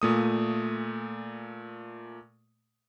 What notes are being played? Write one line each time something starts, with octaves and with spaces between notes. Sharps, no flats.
A#2 A3 D#6